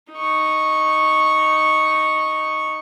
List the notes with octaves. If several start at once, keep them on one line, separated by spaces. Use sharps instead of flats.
D#4 C#6